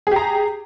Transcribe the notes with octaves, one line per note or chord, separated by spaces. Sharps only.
G4 G#4 A#5